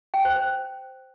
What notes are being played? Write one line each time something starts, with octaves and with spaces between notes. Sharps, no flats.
G5
C5
C5